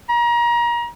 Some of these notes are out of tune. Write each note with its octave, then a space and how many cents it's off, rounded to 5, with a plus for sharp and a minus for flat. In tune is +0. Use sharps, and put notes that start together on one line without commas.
A#5 +30